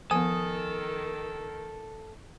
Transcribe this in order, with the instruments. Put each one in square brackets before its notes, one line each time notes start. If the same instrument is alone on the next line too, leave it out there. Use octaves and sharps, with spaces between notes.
[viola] D#3 [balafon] F3 B3 [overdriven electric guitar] A4 [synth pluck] G#5 D#6